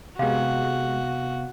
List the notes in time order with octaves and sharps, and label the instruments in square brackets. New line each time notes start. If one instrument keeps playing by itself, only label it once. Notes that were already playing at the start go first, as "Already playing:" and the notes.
[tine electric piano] C3 B3 [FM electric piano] G#3 G4 [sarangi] F#4 [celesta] F5